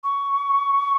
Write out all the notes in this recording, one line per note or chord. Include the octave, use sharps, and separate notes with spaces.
C#6